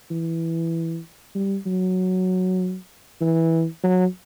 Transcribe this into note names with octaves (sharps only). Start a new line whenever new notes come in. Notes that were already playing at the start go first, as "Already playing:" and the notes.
E3
G3
F#3
E3
F#3